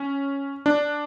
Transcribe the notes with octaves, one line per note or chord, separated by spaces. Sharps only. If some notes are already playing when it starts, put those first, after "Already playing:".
Already playing: C#4
D4